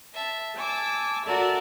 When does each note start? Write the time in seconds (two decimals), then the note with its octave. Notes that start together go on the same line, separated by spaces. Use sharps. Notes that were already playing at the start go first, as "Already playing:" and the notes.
0.13 E5 A5
0.56 G#5 A5 D6 E6
1.25 F#4 A4 A#4 D5 E5 A5